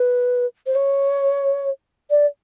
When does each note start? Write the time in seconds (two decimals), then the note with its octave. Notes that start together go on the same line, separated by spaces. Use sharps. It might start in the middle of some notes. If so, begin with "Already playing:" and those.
Already playing: B4
0.66 C5
0.75 C#5
2.10 D5